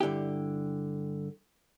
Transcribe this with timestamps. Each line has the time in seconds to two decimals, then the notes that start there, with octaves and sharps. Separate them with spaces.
0.01 G2 D3 E4 G4